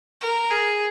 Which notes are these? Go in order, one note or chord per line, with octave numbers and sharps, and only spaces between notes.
A#4
G#4